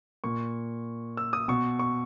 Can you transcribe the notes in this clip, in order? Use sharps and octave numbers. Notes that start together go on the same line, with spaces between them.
A#2 C#6
E6
D#6
B2 C#6
C#6